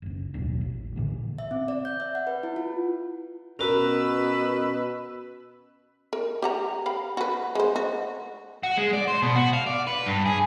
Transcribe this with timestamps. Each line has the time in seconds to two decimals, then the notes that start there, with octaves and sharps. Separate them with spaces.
0.02 F#1 C#2
0.34 A1 D#2 B2 F#3
0.61 A1
0.96 A#2 D3 E3
1.38 E5
1.51 C4
1.68 D5
1.85 G6
2.00 E5
2.15 F#5
2.27 B4
2.43 E4
2.56 F4
3.59 B2 C#4 F#4 A#4 B4 E6
6.13 A#4
6.42 G4 F#5 A#5
6.86 F5 G5 B5
7.17 F#4 B4
7.55 G#3 C5
7.76 F#4
8.63 F#4
8.77 G#3
8.93 D5
9.08 C5
9.22 B2
9.36 F#4
9.53 F5
9.66 D5
9.87 B4
10.06 G2
10.26 G#4